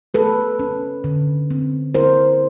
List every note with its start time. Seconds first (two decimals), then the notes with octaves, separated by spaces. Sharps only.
0.14 A3 A4 B4
0.59 C#4
1.04 D3
1.51 C4
1.95 E4 A#4 C5